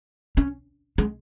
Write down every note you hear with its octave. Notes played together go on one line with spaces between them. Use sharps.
C#4
G#3